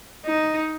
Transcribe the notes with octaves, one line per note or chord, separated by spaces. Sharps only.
D#4